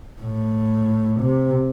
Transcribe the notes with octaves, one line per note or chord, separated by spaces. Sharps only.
A2
C3